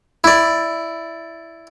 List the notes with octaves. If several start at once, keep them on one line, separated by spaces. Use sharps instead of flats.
E4 D5